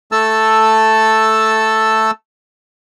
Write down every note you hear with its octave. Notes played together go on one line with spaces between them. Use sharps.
A3 A4 A5 E6